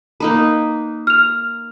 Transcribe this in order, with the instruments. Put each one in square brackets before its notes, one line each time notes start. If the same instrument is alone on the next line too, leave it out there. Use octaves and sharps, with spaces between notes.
[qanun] A#3 D#4 B4
[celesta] F6 F7